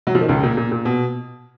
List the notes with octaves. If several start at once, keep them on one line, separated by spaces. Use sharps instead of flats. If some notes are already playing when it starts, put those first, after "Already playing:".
F#3
F3
D#3
C#2 C#3
A#2
A#2
A#2
B2